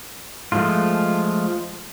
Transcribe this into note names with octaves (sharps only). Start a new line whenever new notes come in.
F3 G#3 A3 F4